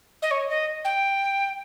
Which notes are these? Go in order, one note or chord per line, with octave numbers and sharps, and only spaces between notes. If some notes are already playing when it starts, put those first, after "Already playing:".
D#5
C#5
D#5
G5